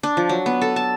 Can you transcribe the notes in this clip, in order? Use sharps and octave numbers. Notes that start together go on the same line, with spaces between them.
D4
F3
F#3
B3
A4
A5